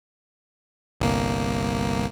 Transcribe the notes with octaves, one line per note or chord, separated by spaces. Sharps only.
G1 C2 A#3